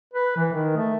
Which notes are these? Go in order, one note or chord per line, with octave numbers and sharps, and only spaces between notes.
B4
E3
D#3
A3